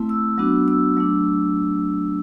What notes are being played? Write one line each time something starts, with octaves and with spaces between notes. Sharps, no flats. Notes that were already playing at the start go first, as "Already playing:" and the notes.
Already playing: A3 C4 E4
E6
F#3 B3 D4 F#4
E6
F#3 A3 D4